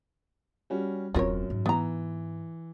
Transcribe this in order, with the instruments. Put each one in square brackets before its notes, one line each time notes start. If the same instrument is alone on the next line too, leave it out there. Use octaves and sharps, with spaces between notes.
[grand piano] G3 C#4 F#4
[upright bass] D#1 C4 [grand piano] F#2 [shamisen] F4 A#4 C#5
[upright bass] G#2
[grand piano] E3 [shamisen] B3 A#5